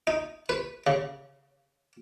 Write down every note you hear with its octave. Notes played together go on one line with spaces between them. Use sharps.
D#4
B4
C#3